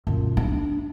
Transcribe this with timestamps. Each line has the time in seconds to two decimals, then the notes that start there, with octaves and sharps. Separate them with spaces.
0.07 F#2 A#2
0.37 D4